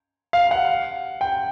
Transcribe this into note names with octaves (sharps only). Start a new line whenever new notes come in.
F5
F#5
G5